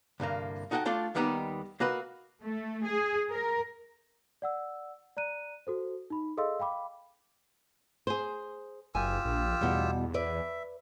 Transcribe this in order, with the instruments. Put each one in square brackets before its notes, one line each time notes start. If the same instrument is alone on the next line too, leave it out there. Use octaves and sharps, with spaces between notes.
[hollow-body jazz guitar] C2 G2 D3 A#3
D#4 F#4 A4 B4 F#5 G5
A3 D4 F4 A4 D5
D#2 D#3 G3 B3 D#4 G4
A#3 F#4 B4 D#5
[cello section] A3
G#4
A#4
[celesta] D5 F#5 E6
D5 A#5 F#6 D#7
F#4 A4 C5
D#4 B5
G#4 A4 D#5 F5 C6 E6
F5 G5 B5 D6
[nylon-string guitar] G#4 C5
[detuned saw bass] F#1 [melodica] F4 G4 E6 [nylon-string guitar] G#5
[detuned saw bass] A#1
[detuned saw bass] E2 [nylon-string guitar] B2 G3
[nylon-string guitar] B4 D5 [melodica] E5